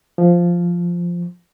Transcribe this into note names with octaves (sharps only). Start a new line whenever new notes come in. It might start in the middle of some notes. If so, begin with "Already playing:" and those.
F3